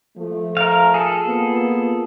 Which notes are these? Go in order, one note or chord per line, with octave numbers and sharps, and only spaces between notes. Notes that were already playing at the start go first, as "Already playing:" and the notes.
F3 A3
A#4 F5
G#4 A4
A#3 B3 F4